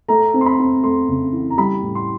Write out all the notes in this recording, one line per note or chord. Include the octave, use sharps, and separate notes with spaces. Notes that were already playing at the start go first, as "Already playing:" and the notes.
A3 A#5
C4
C6
B5
C4
A3 C6
C#3
E3
A#5
G3 B5
A2
C6